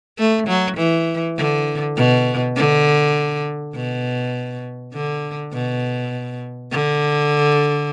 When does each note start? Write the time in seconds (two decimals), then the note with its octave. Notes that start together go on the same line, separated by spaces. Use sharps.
0.18 A3
0.47 F#3
0.77 E3
1.37 D3
1.97 B2
2.56 D3
3.75 B2
4.94 D3
5.53 B2
6.72 D3